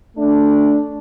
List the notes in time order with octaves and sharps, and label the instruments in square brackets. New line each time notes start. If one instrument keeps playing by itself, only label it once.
[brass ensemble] A3 D4